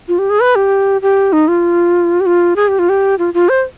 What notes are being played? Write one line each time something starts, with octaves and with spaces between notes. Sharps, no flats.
F4
G4
G#4
B4
G4
G4
D#4
F4
G4
F4
G#4
G4
F4
G4
F4
F4
C5